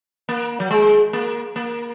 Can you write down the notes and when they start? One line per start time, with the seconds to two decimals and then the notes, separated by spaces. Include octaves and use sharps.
0.29 A#3
0.60 F#3
0.71 G#3
1.13 A#3
1.56 A#3